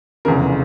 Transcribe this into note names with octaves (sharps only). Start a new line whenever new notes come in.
F1 E2 C#3 A#4